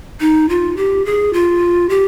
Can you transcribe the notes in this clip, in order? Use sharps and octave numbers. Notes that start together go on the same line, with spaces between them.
D#4
F4
G4
G#4
F4
G4